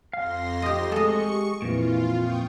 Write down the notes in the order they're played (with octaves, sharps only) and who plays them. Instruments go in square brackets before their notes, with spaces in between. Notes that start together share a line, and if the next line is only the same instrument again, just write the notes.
[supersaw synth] F2 C6 A#6 [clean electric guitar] F5
[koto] G4 D#5
[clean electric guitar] G#3 [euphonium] A3 [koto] A4 D#5 [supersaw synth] C#6 C#7
[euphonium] G4
[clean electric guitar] F2 A#2 [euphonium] E3 [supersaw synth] F4
[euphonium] F4 [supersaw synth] G5 C#6 D#6